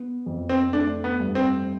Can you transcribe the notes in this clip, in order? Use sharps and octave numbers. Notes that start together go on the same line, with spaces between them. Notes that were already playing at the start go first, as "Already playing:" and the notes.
Already playing: B3
F2
C4
A3 D4
B3
G2
C4